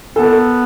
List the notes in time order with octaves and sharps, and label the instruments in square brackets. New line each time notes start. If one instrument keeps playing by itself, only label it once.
[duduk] B3 [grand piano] A4